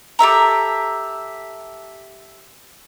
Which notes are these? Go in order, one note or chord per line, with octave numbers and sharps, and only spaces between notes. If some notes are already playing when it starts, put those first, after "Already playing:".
G4 A4 E5 A#5